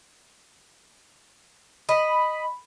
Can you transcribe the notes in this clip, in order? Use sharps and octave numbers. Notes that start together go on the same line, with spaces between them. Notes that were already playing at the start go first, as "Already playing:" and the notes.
D#5 B5